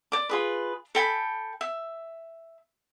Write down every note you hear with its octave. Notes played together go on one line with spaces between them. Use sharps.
D5 D6
F4 G#4 B4
A4 G5 G#5 B5
E5